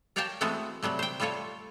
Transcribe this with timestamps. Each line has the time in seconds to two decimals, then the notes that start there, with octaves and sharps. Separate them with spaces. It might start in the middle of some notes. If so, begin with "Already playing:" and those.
0.16 A#4 C#5 D5 F5 G5 A5
0.41 E3 G#3 A3 B3 C4 F#4
0.82 C3 F#3 G3 A3
0.99 C5 G5
1.20 G3 A3 F4 A4 C#5